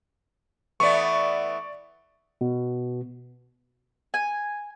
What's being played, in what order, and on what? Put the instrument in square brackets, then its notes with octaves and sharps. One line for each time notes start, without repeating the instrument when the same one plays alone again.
[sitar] E3 A3 B3 [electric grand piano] D5 C#6
[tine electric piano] B2
[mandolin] G#5